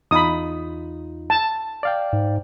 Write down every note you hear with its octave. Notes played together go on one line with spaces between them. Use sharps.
E2 D#4 F4 B5 D#6
A5
D5 F5 G5
G#2